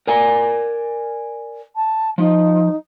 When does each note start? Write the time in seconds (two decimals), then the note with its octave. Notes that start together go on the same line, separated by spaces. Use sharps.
0.07 A#4 D5 G#5
1.75 A5
2.18 F3 D#4